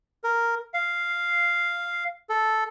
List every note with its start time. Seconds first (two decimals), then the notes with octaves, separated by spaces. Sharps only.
0.24 A#4
0.74 F5
2.29 A4